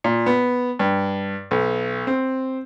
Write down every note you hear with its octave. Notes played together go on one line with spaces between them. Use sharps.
A#2
B3
G2
B1
C4